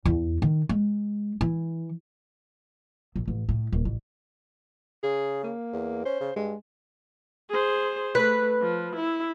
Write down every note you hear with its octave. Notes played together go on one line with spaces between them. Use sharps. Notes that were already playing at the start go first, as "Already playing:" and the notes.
E2
D#3
G#3
E3
A#1
A1
A2
D#1
A1
C#3 G#4
A#3
E2
C#4 C5
C#3
G2 G#3
G#4 C5
A3 B4
F3
E4